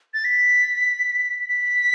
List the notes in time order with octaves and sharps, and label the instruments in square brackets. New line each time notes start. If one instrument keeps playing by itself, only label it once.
[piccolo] A6
B6
B6